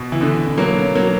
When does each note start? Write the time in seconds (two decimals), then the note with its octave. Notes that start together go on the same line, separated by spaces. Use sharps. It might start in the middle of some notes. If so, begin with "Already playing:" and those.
Already playing: B2
0.12 E3
0.21 B2 D3
0.57 F#3 A#3
0.95 F#3 A#3